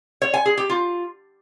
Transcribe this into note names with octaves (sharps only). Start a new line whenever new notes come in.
C#5
G#5
G#4
G4
F4